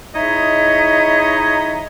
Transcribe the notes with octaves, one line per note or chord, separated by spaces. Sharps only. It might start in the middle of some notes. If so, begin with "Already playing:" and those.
D#4 E4 G#4 C#5 D#5 E5